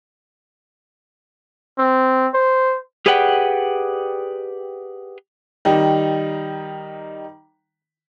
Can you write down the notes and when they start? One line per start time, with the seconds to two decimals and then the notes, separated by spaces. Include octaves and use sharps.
1.78 C4
2.34 C5
3.06 G4 G#4 B4 D5 F#5 G5
5.65 D#3 G3 D#4